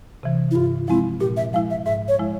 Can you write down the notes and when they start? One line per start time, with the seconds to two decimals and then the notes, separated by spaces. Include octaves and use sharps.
0.23 C3 E3
0.51 E4
0.55 G2 F4
0.88 F3 G#3 C4 E4
1.20 A#2 G4
1.37 E5
1.53 F3 G#3 E4 F5
1.70 E5
1.86 G#2 E5
2.08 C#5
2.19 F3 G#3 E4